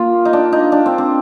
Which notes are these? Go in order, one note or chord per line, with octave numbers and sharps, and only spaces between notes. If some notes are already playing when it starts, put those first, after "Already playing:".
Already playing: A#3 F4
D#4
D4
D#4
D4
C4
C4